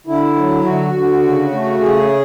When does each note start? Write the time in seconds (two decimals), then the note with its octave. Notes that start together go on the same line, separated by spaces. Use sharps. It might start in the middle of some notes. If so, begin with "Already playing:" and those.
0.06 D3 E4
0.36 F#3
0.65 D3 F#4
0.93 D3
1.23 C#3
1.52 A3
1.80 C#3 G#4